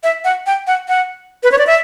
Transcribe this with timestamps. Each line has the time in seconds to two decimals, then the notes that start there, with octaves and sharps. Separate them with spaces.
0.03 E5
0.24 F#5
0.46 G5
0.67 F#5
0.88 F#5
1.43 B4
1.52 C#5
1.58 D5
1.67 E5